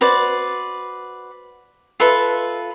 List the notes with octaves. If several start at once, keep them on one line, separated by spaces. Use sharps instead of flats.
F#4 B4 C5 D5
F4 A4 B4 E5